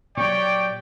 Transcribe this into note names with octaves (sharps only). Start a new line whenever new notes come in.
A#2 F#3 G4 C#5 D5 G5